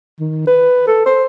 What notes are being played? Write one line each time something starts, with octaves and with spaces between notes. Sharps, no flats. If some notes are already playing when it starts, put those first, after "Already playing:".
D#3
B4
A4
C5